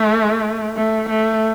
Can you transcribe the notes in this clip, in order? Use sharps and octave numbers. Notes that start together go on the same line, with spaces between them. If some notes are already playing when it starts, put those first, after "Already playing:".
Already playing: A3
A3
A3